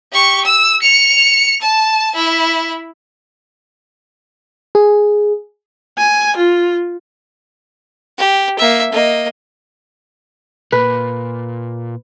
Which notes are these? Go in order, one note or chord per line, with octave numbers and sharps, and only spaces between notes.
G4 C#6
E6
C#7 F7
A5
E4
G#4
G#5
F4
G4
A#3 E5
A#3 D#5
A#2 B4